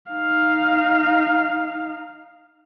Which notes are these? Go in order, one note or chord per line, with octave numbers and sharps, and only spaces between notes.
D#4 F5